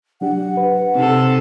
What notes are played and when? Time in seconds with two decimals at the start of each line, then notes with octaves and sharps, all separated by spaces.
0.21 F#3 D4 G4 F#5
0.57 B4
0.95 C3 C4 D#4 A4